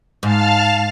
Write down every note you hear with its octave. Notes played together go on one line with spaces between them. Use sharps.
G#2 F5 A5 F6